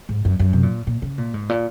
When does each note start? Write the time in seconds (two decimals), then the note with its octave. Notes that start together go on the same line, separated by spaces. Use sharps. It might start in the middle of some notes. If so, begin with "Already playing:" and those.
0.09 G#2
0.25 F#2
0.39 F#2
0.53 C3
0.63 A#2
0.87 A#2
1.02 C#3
1.18 A#2
1.34 G#2
1.49 A#2